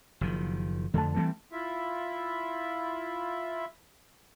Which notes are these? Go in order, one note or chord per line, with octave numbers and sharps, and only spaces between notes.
F#1 D#3 F3
F2 D3 A3 A5
E3 G3 C4
E4 F4 E5